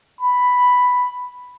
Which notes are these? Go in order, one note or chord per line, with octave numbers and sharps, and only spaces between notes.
B5